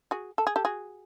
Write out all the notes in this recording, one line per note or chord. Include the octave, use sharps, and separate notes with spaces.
F#4 G#4
A4
G#4
G4 A4
F#4 G#4